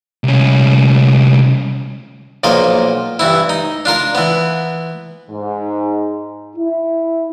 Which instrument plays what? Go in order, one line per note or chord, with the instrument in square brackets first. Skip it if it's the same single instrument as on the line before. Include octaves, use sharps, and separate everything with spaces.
[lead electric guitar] C2 C#4
[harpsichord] B1 A#2 F3 A#3 D#5
G2 E3 E4
D#4
D4 F4 A#4 A5
E3 B3
[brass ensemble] G#2
E4